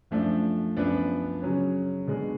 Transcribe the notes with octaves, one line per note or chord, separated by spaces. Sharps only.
F#2 F3 A3 D4
F#2 F3 B3 D4
C#3 F#3 C#4
B2 G#3 D4